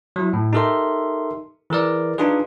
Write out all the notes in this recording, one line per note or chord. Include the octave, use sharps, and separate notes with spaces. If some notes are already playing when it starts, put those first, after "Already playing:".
F#3 E4
A2
D#4 G4 A4 A#4 E5 C6
E3 G#4 A#4 D5
D4 D#4 F4 G#4 B4